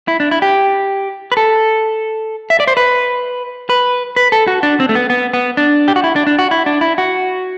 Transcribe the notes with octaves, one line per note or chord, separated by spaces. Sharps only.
E4
D4
E4
G4
B4
A4
E5
D5
C5
B4
B4
B4
A4
F#4
D4
C4
A3
B3
B3
B3
D4
G4
F#4
E4
D4
D4
F#4
E4
D4
E4
F#4